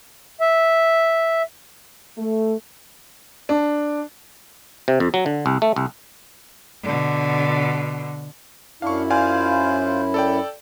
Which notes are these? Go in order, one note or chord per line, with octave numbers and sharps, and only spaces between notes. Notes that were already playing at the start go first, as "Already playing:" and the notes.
E5
A3
D4
C3
F2
F#3
D3
C2
A3
C2
B2 D3
F#2 D4 E4 F5 C#6
F4 C5 D5 F5 G#5
A4 D5 G5